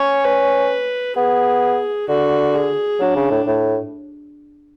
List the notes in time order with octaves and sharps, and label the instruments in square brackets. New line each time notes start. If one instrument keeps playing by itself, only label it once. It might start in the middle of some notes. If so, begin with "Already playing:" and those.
Already playing: [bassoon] C#4 [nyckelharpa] C#5
[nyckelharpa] B4
[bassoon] B3 [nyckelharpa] G#4
[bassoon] D3 [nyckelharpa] F#4
[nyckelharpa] G#4
[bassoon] F#3 [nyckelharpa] D4
[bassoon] C#3
A2
A2